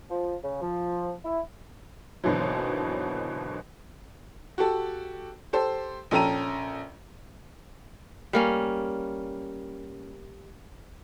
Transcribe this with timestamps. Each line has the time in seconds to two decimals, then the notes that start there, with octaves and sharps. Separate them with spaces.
0.10 F3
0.43 C#3
0.62 F3
1.25 E4
2.24 G#1 D#2 B2 D3 E3 F#3
4.58 F#4 G4 A4
5.53 G4 A4 C5
6.11 A#1 C#4 A4 G5 A#5 D#7
8.33 G3 A#3 C#4